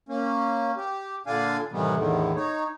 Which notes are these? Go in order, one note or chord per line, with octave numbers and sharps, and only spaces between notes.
A#3 C#4
G4
A#2 D3 D4 D5 F5 G#5
A2 C3 D#3 E3 G3 B3
E2 A2 D3 D#3
D#4 C#5